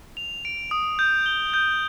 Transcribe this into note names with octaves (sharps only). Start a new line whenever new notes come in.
F7
D7
D#6
G6
G7
G6